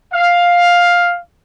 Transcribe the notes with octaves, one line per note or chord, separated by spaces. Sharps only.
F5